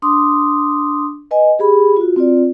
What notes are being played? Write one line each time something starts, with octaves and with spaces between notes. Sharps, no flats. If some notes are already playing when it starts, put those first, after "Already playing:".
D4 C6 D6 D#6
B4 D#5 G#5
G4 G#4 B5
F4 F#4
C4 F4 D5